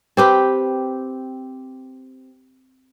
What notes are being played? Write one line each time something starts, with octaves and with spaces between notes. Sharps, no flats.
C4 G4 B4